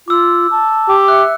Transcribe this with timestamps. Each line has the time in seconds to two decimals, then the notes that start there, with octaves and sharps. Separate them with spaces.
0.08 F4 D6 E6
0.51 A5
0.89 G4
1.08 E5 F#6 C#7